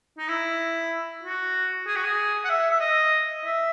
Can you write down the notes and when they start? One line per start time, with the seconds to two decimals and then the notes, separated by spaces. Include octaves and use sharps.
0.18 D#4
0.28 E4
1.23 F#4
1.86 G#4
1.96 F#4
2.04 G#4
2.44 F#5
2.49 E5
2.71 E5
2.80 D#5
3.44 E5